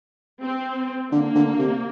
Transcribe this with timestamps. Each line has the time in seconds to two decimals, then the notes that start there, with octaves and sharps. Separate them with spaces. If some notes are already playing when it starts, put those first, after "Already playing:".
0.41 C4
1.12 D3 A#3
1.35 D3
1.59 C3